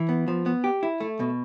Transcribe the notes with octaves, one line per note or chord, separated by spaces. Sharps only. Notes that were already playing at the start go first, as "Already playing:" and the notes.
Already playing: E3
B3
F3
B3
G4
E4
A3
B2